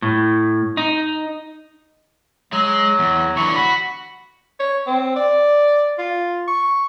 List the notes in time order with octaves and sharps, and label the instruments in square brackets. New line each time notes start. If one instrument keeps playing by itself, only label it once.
[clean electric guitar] A2
D#4
[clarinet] F#3 [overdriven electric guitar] G#3
[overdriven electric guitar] E2
[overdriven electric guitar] D3 E3 [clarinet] C#6
[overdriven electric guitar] F#4 [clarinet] B5
[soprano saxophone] C#5
C4
D5
F4
C#6